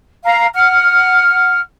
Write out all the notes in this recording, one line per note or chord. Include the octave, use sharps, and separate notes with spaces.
F5 A#5
F#5 F6